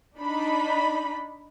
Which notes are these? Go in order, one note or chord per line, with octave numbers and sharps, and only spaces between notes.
D4 D#4 B5